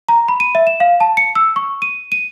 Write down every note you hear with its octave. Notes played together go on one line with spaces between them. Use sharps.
A#5
B5
D#7
E5
E7
F5
A5
C#7
E6
C#6
D#7
D#7